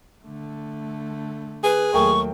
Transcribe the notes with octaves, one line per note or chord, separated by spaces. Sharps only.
D3 A3
G#4 B4
D#2 F#3 A3 A#4 G5 C#6